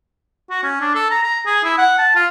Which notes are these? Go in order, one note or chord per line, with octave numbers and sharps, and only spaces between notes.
F#4
C#4
D4
A4
A#5
A#5
G#4
E4
F#5
A5
F4